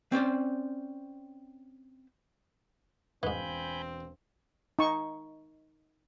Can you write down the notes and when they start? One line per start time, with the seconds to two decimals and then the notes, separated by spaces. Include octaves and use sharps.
0.12 C4 C#4 C5 D5
3.23 E1 G#2 E3 C4 F5 G#5 B5 G6
4.79 D#4 C#6